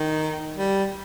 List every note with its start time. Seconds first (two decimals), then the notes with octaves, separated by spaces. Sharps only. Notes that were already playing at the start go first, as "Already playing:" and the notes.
Already playing: D#3
0.57 G3